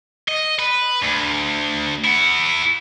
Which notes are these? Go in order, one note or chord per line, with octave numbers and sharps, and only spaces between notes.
D#5
B4
D2
E4 F#5